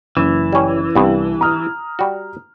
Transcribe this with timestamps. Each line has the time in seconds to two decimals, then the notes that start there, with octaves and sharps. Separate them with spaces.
0.17 F#1 E3
0.53 G3 C#4
0.95 C2 G2 B3
1.41 A#5 D#6 F6
1.99 G3 F#4